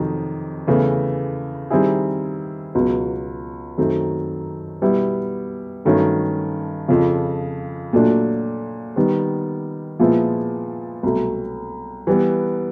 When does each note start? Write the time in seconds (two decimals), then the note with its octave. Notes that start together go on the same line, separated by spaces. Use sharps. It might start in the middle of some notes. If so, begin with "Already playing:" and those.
Already playing: F2 C3 D#3 F#3
0.67 E2 C#3 E3 A3
1.70 D#3 G3 C4 E4 G#4
2.75 C#2 B2 F#3
3.78 F#2 D#3 F#3 A3 C4
4.81 B2 G3 B3 E4
5.85 G2 D#3 F#3 A3 C#4
6.88 F2 C#3 F3
7.93 A#2 F#3 A3 D4
8.96 D#3 G3 B3
9.99 A#2 F3 G#3 B3 E4
11.03 C2 B2 F#3 A3
12.07 E3 G3 B3